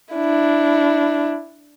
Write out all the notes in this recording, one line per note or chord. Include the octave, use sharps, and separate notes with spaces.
D4 E4